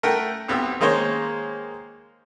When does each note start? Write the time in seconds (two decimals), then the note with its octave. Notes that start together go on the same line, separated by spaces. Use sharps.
0.03 A3 A#4 F#5 G5
0.48 B1 B3 C4 G4 E6
0.81 D#3 G#3 A#3 C5 C#5